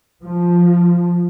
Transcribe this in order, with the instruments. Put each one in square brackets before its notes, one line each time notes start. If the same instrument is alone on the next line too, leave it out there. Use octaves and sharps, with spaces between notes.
[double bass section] F3